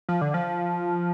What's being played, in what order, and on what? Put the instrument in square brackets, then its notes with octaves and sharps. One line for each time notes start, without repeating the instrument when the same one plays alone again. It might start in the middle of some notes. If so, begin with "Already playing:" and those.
[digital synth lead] F3
D3
F3